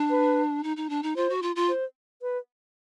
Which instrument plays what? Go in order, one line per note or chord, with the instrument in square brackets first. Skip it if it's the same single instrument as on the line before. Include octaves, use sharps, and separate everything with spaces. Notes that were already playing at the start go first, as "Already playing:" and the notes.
Already playing: [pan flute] D4
[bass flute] B4
[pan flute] D#4
D#4
D4
D#4
[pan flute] F4 [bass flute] C5
[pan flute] F#4
F4
F4
[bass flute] C5
B4